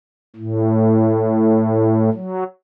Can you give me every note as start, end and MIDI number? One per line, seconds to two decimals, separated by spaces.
0.36 2.10 45
2.13 2.44 54